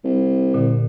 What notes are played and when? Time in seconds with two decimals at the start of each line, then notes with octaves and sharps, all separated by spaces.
0.04 C2
0.54 A#2 D3